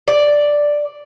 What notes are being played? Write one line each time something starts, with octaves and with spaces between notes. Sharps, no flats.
D5